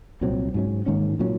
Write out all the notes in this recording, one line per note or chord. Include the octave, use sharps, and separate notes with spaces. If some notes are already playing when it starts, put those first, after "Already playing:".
C2 A#2 F#3 C4
G#2 F#3 C#4
G#2 D#3 A#3 C#4
A#2 F#3 C#4